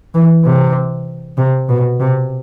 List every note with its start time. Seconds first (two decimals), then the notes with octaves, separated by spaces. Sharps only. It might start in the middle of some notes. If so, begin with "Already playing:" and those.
0.15 E3
0.45 C3
1.38 C3
1.69 B2
2.00 C3